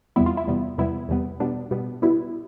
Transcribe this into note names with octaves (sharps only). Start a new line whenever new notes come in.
E2 C3 G3 B3 E4
F4
E4
E2 C3 G3 B3
E2 C3 G3 B3 E4
E2 C3 G3 B3
B2 G3 B3 D4
B2 G3 B3
B2 G3 B3 E4